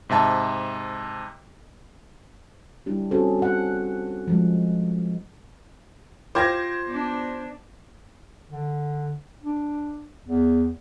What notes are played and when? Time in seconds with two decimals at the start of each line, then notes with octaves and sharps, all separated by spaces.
0.09 G#2 C3 E5 A5
2.86 G3 D4 E4 G4
3.11 C4 C#4 F#4 G#4 A4 C5
3.39 F#4 F#5
4.28 F3 G#3
6.35 F4 G4 C5 F5 D6 G#6 A#6
6.86 B3 D4
8.50 D3
9.43 D4
10.27 E2